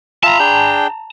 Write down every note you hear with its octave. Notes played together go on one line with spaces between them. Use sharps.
F4 E5 A5 A#5
D4 G#4 G5